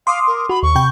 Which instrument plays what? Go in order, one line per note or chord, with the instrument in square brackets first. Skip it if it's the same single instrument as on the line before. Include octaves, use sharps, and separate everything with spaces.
[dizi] F5 [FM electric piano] C6 D6 D#6
[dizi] A#4
[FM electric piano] F#4 [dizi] B5
[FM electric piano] D#2 [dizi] C#6
[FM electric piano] C3 G5 G6